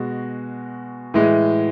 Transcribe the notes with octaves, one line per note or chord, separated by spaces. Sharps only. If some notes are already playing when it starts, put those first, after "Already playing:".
Already playing: B2 G#3 F#4
A2 E3 G#3